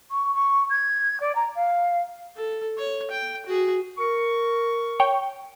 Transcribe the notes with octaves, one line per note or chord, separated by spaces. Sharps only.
C#6
C#6
G#6
D5
A#5
F5
A4
C#5
G5
F#4 G#4
A#4 C#6
C#5 G5